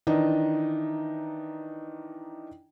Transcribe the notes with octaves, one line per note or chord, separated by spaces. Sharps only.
D#3 E3 D4 D#4 D#5